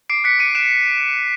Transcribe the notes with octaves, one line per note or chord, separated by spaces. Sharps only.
D6 C7 D7
F#6 B6 C#7
D6 C#7 D#7
F#6 D7 E7